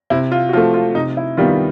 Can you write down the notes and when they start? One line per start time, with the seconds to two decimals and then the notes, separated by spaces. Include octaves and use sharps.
0.10 C3 E4
0.32 F4
0.49 F#4
0.53 F3 A3 F4
0.74 F4
0.95 C3 D#4
1.17 E4
1.37 D#3 G3 B3 F4